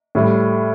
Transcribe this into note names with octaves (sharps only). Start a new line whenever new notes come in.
A2 G3